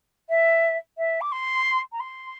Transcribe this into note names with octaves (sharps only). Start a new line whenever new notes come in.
E5
E5
D6
C6
A#5
C6